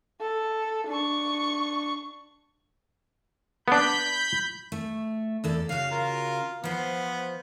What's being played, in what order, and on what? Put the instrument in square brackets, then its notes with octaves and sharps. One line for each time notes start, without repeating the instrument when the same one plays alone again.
[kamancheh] A4
D4 C#6
[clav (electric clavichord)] B3 D4 [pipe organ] B5 G6
[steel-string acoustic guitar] A3
E2 A4 D5
[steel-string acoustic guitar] C#3 F#4 [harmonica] F5
[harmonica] F4 A#4
[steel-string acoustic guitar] F3 C5 [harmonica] B3